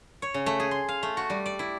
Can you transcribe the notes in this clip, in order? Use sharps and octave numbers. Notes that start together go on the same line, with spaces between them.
C#5
C#3
A3
G#4
C6
F5
A3
F#4
G3
D5
E4